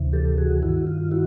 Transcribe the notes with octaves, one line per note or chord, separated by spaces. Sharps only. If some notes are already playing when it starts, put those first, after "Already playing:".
Already playing: D2 C3 E3
G4 A4
F#4 G#4
G2 D#3 E4 F#4
F4
E4 F#4